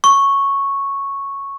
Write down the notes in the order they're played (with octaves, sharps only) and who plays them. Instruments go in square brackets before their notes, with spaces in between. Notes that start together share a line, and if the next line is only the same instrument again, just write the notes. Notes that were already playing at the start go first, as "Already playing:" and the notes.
[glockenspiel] C#6